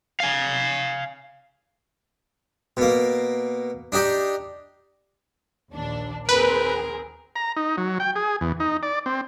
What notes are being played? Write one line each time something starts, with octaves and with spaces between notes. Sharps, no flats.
F5 G#5
B2 A#3
D4 D#4 G4 D5
A#1 D#2 D4
D#2 C4 G#4 A#4 B4
A#5
D#4
F#3
G5
G#4
E2
D#4
D5
C4